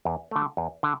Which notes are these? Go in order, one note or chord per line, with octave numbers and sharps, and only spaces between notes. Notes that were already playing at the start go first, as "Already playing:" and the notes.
E2
D3 A3
E2
D3